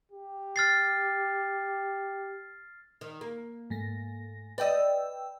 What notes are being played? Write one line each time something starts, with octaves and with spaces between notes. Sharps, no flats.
G4
F6 A6 C7
D#3
A#3
G#2 A3 A#6
B4 D5 D#5 G5 E6